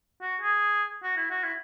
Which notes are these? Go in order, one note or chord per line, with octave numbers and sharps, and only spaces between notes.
F#4
G#4
F#4
E4
F#4
E4